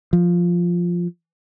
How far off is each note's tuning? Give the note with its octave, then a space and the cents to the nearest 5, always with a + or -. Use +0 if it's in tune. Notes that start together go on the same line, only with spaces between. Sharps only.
F3 +0